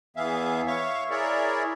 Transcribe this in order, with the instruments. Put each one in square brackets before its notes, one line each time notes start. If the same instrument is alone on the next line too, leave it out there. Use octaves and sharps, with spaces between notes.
[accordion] E2 E3 B3 G#4 E5 F5
C#5 E5 F5 C#6
E4 G#4 A#4 C#5 D5 E5